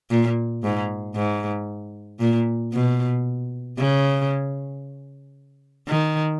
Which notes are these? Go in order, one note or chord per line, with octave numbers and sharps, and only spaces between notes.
A#2
G#2
G#2
A#2
B2
C#3
D#3